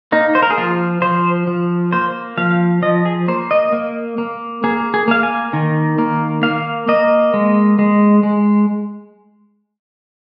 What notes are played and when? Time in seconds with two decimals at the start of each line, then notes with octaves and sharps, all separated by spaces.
0.12 A#3 D#4
0.35 C5
0.42 A#4
0.50 G#4
0.57 F3 F4
1.02 F3 C5
1.47 F3
1.93 A#3 C5
2.37 F3 F5
2.82 F3 D#5
3.05 G#4
3.28 A#3 C5
3.51 D#5
3.73 A#3
4.18 A#3
4.64 A#3 G#4
4.94 G#4
5.08 A#3 F5
5.23 G#5
5.53 D#3
5.98 A#3
6.43 A#3 F5
6.88 A#3 D#5
7.34 G#3
7.79 G#3
8.23 G#3